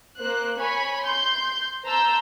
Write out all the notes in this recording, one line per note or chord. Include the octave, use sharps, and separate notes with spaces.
A#3 C5 F#6
C#5 G#5 B5 C#6
C6 G6
C5 A5 A#5 E6 G6